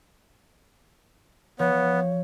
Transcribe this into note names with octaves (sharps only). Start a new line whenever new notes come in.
F3 B3 C#5